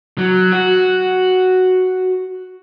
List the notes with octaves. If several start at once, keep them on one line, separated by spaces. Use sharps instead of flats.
F#3
F#4